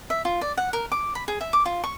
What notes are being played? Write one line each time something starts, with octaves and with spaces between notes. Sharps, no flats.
E5
F4
D5
F#5
A#4
D6
B5
G#4
E5
D6
F4
C#6